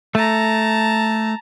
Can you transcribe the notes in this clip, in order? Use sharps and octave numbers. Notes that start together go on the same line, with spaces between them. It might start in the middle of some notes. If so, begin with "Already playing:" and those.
A3 A5 A#5